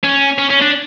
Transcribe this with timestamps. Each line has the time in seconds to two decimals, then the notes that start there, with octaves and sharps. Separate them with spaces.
0.03 C#4
0.39 C#4
0.50 C#4
0.62 D4